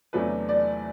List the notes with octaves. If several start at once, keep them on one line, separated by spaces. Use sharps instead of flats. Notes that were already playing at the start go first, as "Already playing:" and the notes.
E2 C3 F#3 A3 D4 B4
D5